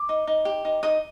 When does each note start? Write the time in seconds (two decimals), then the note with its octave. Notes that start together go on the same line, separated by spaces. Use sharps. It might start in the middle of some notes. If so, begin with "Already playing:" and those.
Already playing: D6
0.09 D#4
0.27 D#4
0.45 G4
0.65 D#4
0.83 D#4 D#6